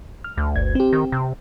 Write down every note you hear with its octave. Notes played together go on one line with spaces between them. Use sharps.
F6
D2
G1 G#6
C4 G4
D#3
C3